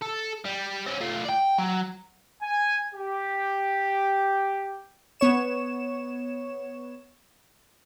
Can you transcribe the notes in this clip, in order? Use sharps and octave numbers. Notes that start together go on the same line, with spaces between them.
A4
G3
C4 C#4
A3 F4
D5 G5
F#3
G#5
G4
B3 C#5 E7